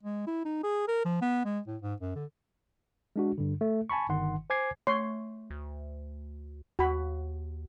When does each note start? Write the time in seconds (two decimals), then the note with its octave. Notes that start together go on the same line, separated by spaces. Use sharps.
0.03 G#3
0.27 E4
0.45 D#4
0.63 G#4
0.88 A#4
1.05 F3
1.22 B3
1.45 G#3
1.67 A2
1.82 G#2
2.00 F#2
2.15 D3
3.16 G#3 D4 F#4
3.38 G2 D3
3.61 A3
3.90 G#5 A5 B5 C#6
4.09 G1 D#3 F#5 C6
4.50 C5 G#5 D6 G#6 C7
4.87 A3 C#5 C6
5.50 D2
6.79 D#2 F#4 B5